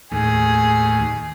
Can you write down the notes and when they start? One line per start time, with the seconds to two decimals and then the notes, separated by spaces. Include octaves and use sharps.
0.12 D#2 A2 G#4